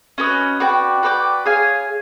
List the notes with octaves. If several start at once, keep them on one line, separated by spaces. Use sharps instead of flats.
C#4 F#4 B4 D#5
F#4 B4 D5 G5
F#4 B4 D5 G5
G#4 C#5 F5 G#5